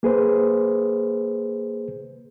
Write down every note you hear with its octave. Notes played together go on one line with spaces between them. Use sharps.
A#3 G#4 B4 C5